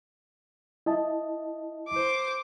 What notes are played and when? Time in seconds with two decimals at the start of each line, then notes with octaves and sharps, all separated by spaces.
0.86 E4 D#5 A5
1.89 C5 D6